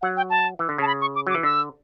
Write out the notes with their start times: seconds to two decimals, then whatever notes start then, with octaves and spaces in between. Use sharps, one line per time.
0.02 F#3 F#5
0.17 G5
0.30 A5
0.59 E3
0.69 D3
0.78 C#3 A5
0.87 B5
1.01 C#6
1.15 D6
1.27 F#3 D6
1.35 E3
1.43 D3 E6